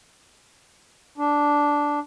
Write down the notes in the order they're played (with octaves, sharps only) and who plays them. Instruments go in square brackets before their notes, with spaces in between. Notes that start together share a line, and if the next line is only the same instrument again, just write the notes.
[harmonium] D4